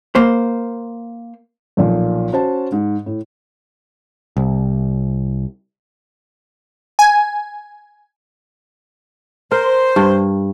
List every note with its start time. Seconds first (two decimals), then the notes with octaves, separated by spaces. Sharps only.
0.15 A#3 C5
1.77 B1 A#2 F3
2.33 C#4 F#4 C5 A5
2.72 G#2
3.06 A2
4.37 C2
6.99 G#5
9.52 A#4 C5
9.96 G2